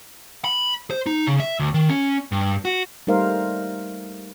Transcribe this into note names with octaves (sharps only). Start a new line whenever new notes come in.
B5
C5
D#4
C#3
E5
D2
D#3
C#4
G2
F#4
G3 A3 D#4 A#4 C5 F5